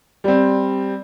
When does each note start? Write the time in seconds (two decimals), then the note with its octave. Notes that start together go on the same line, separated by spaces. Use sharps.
0.24 G3 C4